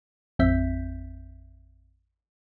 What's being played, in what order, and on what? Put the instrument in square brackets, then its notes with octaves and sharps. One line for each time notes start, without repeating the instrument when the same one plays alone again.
[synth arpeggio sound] A1 F2 C4 E5 G6 B6